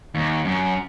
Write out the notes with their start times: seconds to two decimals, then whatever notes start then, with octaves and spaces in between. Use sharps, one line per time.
0.15 D#2
0.45 F#2